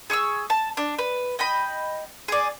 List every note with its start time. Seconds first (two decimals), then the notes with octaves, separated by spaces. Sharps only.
0.10 G#4 C#6 D#6 E6
0.50 A5
0.77 D4
0.99 B4
1.39 D#5 G5 B5
2.28 G#4 D5